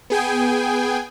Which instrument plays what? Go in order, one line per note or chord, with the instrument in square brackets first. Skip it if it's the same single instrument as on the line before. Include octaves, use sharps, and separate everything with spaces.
[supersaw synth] B3 G#4 G5 G#5